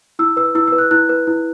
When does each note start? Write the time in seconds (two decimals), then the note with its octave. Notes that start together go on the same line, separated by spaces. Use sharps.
0.19 E4 E6
0.37 B4 E6
0.55 E4 E6
0.68 B4 E6
0.78 F#6
0.91 E4 F#6
1.09 B4
1.27 E4